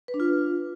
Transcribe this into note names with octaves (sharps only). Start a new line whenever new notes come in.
B4
D4
F4